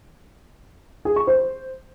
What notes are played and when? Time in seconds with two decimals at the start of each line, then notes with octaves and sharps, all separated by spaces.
1.05 G#4
1.16 C#6
1.27 C5